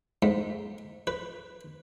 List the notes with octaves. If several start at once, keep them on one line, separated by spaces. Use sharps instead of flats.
G#2
B4